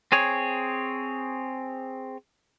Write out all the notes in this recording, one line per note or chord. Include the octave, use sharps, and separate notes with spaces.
C4 G#4 C#5